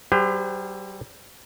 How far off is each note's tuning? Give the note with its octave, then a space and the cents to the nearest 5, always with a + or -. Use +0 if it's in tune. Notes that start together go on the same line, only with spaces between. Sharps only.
G3 -35 G4 +40 C5 -30